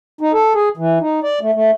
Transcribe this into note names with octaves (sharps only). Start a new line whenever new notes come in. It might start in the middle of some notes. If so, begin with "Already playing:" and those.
D#4
A4
G#4
E3
D#4
D5
A3
A3